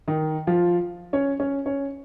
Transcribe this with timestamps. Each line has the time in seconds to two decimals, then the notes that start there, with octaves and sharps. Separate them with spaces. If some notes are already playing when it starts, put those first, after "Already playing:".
0.08 D#3 D#4
0.47 F3 F4
1.13 C#4 C#5
1.40 C#4 C#5
1.66 C#4 C#5